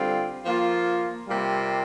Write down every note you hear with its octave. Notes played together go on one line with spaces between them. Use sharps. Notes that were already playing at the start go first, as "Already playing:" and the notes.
Already playing: D3 G3 C4 F4
F3 A#3 F4
C3 G3 A#3 F4